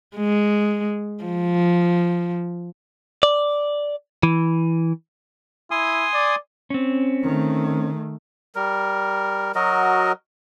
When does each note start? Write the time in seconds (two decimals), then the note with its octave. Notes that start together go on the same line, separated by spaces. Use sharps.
0.16 G#3
1.24 F3
3.23 D5
4.23 E3
5.71 E4 G#5 C6 D#6
6.14 D5
6.70 C4 C#4
7.23 D#3 A3
8.56 G3 A#4
9.55 F#3 F#4 A#4 D#5